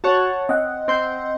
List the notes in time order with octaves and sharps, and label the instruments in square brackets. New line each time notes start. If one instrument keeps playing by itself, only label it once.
[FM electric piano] F#4 [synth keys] C#5 F#5 A5
[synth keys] C4 [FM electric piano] D#5 F#5
[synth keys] C4 C6 G6